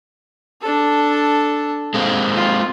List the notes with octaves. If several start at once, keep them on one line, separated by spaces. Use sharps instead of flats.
D4 A4
G#3 A#3 C4
F4